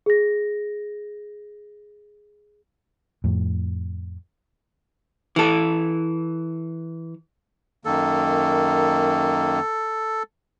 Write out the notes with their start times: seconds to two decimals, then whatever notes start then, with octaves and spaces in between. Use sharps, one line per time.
0.06 G#4 A#6
3.24 F2 A2
5.36 E3 A4
7.85 F#2 D#3 A#3 A4